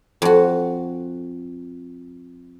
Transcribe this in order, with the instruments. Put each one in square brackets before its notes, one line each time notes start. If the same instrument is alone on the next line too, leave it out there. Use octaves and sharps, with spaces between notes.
[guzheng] F2 F#4